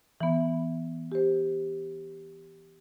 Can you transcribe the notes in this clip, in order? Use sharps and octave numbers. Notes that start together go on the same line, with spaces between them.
E3 B3
G4 C5